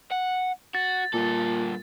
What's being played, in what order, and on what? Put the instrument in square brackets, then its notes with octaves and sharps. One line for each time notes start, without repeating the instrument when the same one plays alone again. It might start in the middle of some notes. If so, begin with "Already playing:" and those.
[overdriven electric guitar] F#5
[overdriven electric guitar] F#4 [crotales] A6
[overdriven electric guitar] G2 A4 [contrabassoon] A#2